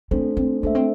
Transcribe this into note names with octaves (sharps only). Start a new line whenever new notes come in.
A3 C4 D4 A4 C5
C4
A3 A#3 D4 A4 C5 E5
C4